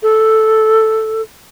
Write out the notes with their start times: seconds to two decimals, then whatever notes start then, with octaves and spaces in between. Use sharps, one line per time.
0.03 A4